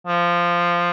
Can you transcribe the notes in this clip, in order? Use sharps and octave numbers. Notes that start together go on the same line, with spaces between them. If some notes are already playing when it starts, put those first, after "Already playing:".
F3